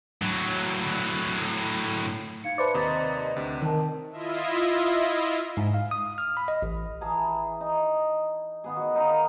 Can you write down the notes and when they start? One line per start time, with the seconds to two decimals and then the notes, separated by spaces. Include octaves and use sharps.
0.22 A2 F#3
2.44 D#4 F5 G#6 C#7
2.58 B4 C5 D5 E5 A5
2.74 D#2 C3 D#5 A#5 D6 A6
3.36 D2 C3 E5
3.62 D#3 C4 A#4 A5
4.11 E4 F4 D#5 E5
5.57 G#2
5.74 F5
5.91 D#6
6.18 F6
6.37 B5
6.48 D#5
6.62 A1
7.01 E3 G#4 A5 A#5
7.61 D#4
8.64 D#3 B3 G#4
8.76 F#4 D#5
8.96 D#4 A#4 F5 C6